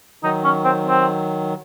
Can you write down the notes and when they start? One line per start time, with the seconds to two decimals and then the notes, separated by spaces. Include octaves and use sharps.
0.23 D#3 F#3 D#4
0.44 C#4
0.64 C4
0.86 C4